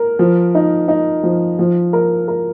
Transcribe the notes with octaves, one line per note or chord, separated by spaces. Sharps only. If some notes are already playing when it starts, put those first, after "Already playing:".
Already playing: A#4
F3
D#4
D#4
F3
F3
A#4
A#4